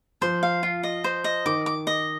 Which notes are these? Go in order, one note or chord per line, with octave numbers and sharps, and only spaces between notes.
F3 C5
F5
F4
D#5
C5
D#5
D#3 D6
D6
D#5